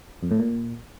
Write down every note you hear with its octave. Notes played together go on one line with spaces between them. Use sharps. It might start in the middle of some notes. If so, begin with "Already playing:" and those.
F2
A2
A#2